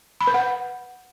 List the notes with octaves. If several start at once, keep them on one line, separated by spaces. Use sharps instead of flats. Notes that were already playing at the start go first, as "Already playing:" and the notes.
B5
B4
F#5